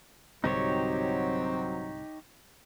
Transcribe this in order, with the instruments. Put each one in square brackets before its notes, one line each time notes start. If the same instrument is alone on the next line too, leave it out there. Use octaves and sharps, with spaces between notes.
[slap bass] C2 G#2 D3 [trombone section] F#3 [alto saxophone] C4 [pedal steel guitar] D#4 G4 C#5